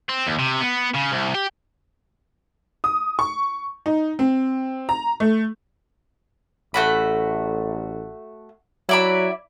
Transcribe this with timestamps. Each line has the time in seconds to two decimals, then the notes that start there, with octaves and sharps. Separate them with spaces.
0.09 C4
0.27 D#2
0.39 C3
0.61 B3
0.95 C#3
1.12 C2
1.35 G4
2.84 D#6
3.19 C#6
3.86 D#4
4.19 C4
4.89 A#5
5.20 A3
6.74 A1 A3 F#4 B5
8.89 F#3 E4 D5 B5